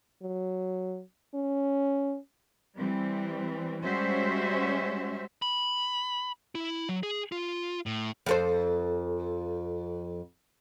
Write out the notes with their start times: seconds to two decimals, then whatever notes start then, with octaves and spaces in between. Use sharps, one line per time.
0.22 F#3
1.35 C#4
2.77 E3 G3 C4
3.84 G3 G#3 C#4 F#4 C5 E5
5.42 B5
6.55 E4
6.89 F#3
7.03 G#4
7.32 F4
7.86 A2
8.26 F2 A4 C5